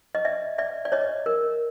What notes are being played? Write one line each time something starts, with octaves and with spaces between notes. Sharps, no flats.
D#5
D5 E5
D5 E5
D5
C#5 D#5
A#4